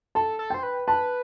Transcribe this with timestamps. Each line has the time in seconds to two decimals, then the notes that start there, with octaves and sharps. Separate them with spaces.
0.15 A4 A5
0.39 A4
0.50 C5 G5
0.63 B4
0.87 B4 A5